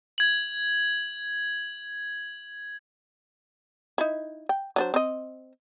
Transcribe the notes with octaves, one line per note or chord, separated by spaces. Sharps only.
G#6 F#7
D#4 E4
G5
F#3 D4 C5
C4 D#5